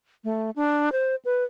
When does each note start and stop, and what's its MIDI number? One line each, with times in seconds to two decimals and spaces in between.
0.24 0.50 57
0.56 0.92 62
0.92 1.15 72
1.25 1.44 71